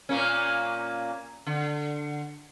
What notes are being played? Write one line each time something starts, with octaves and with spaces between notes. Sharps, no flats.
A#2 A#3 C#4
D3